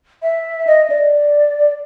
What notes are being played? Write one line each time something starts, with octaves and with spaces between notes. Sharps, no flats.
E5
D#5
D5